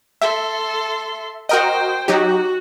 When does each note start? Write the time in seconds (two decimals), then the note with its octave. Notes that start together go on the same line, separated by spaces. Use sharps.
0.22 A4 E5 C6
1.49 F#4 A#4 C5 D#5 G5
2.08 F#3 D#4 F#4 G4